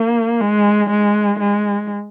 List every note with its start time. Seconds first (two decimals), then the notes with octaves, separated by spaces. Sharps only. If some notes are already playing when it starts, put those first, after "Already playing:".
Already playing: A#3
0.41 G#3
0.89 G#3
1.39 G#3